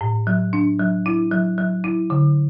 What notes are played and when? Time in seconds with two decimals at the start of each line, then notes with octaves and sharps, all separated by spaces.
0.01 A2
0.27 F#3
0.53 D4
0.79 F#3
1.06 E4
1.31 F#3
1.58 F#3
1.84 E4
2.10 D3